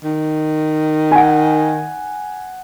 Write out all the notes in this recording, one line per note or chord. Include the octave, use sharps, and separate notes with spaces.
D#3
F#5 G#5